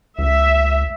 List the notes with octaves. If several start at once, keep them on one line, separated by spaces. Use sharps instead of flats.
C#2 E5